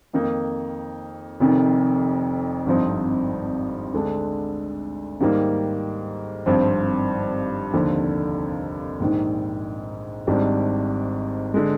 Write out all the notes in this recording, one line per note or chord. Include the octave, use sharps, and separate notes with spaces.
F2 D#3 A#3 D#4
F1 F2 C3 D#3
G#1 G2 F3 C4 D#4
D2 D3 G#3 D4
G#2 D#3 G3 A#3
G#1 G2 F3 C4
F1 D#2 D3 F3
A#1 G#2 D#3
G#1 G#2 G3 D4
D3 G#3